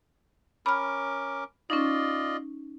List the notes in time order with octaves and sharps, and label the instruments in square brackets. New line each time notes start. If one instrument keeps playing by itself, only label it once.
[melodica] C#4 A#4 D6 [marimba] B5 F6
[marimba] C#4 D#4 [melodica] F4 D5 D#5